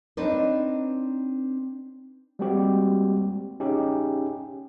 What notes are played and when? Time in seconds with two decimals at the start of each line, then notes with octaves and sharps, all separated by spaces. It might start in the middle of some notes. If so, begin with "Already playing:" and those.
0.17 C4 D4 D#4 B4 C#5 D5
2.39 G3 G#3 A#3 C4 F#4 G4
3.60 C#4 D#4 G4 G#4